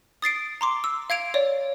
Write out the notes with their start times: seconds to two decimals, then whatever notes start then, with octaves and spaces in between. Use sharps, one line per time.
0.22 D#6 A6 C7 D7
0.61 A#5 C6 D6
0.84 E6
1.10 F5 G#6 D7 F7
1.34 C#5 D5